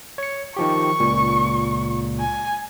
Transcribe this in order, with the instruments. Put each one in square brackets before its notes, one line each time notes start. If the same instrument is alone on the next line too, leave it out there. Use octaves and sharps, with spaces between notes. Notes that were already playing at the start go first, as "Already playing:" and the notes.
[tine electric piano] C#5 C#7
[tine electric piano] D#3 F3 G4 [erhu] C#6
[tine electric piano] C#2 A#2
[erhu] G#5